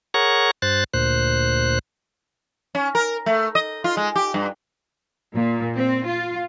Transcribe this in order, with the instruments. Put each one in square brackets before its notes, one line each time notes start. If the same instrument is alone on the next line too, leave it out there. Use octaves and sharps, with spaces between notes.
[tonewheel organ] G#4 A#4 C#5 F#5 A#5 C#6
G2 C5 F#6 A6
D2 A#2 C5 F#6
[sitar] C#4
A#4
A3
D#5
F4
G#3
G4
G2
[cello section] A#2
C4
F4